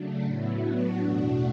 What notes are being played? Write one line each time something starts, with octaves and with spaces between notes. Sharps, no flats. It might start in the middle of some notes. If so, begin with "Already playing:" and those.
Already playing: C#3 F#3 A3 D4
A2 F#3 B3 E4
A2 F#3 B3 D4 F#4
E2 B2 A3